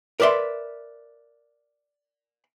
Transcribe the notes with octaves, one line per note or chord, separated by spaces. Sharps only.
A#4 B4 D5 E5 C6